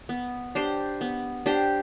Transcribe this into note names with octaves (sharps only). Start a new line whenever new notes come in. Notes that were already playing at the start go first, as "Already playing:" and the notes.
B3
D4 G4 C5
B3
D4 G4 C5